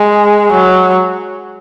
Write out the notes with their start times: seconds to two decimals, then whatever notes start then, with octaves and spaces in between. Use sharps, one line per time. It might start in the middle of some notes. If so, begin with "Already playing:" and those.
Already playing: G#3
0.52 F#3